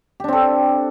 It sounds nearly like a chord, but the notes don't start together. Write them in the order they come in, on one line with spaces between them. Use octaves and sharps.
G4 D4 C4 A4